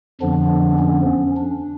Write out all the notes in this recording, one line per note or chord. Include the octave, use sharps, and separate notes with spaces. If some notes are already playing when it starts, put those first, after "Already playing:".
F2 D3 F3 B3 D4
C#4
D4